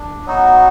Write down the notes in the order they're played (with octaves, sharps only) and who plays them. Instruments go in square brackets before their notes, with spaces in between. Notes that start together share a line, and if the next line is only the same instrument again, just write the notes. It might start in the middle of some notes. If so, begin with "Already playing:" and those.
Already playing: [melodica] D4
F#3 B3 D#4 F#4